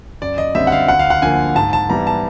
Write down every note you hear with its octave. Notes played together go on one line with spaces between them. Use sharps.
F#2 D5
D#5
D3 G3 C4 E5
F#5
F5
D2 F#5
F5
F#5
D3 F3 A#3 G#5
G#2 A5
A5
E3 G3 B3 E4 A#5
A5